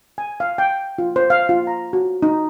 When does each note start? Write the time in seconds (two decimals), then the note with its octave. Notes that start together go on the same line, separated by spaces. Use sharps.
0.18 G#5
0.40 F5
0.58 G5
0.98 F4
1.16 C5
1.30 F5
1.49 F4
1.67 A#5
1.93 F#4
2.23 D#4